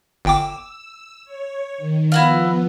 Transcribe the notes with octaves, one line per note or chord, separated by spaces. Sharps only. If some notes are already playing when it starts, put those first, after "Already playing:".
G1 G5 D6 E6
C#5
D#3
F3 B3 E4 F#4 F5